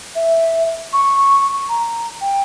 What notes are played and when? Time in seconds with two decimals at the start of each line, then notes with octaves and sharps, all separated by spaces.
0.15 E5
0.93 C#6
1.69 A#5
2.21 G5